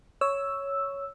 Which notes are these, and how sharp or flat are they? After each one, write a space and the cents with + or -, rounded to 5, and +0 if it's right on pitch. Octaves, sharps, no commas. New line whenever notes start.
C#5 +5 E6 +0